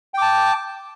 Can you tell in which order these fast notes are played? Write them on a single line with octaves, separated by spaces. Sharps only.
G5 D6 A5